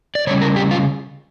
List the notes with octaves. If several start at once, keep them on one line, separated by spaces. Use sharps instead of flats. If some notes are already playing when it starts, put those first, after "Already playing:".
D5
C#3 G3 C#4 C#5
A#4
G4
F4